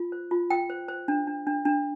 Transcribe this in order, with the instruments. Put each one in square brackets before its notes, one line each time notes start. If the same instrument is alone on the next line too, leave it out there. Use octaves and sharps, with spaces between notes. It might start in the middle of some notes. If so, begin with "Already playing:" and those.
Already playing: [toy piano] F4
C5
F4
F4 G5
C5
C5
D4
D4
D4
D4